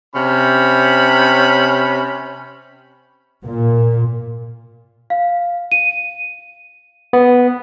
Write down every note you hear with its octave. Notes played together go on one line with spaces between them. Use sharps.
C3 C#4 B5
A#2
F5
D#7
B3